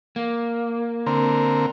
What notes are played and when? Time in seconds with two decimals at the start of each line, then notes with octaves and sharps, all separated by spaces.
0.16 A#3
1.06 D3 C4 A#4